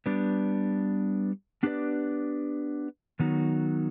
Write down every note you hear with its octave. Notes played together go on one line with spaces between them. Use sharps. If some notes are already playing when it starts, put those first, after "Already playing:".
G3 B3 D4
B3 D4 G4 B4 D5
D#3 F#3 B3 D#4